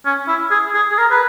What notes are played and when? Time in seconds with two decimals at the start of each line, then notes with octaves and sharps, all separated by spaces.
0.06 C#4
0.28 E4
0.51 G#4
0.74 G#4
0.92 G#4
0.98 A#4
1.11 B4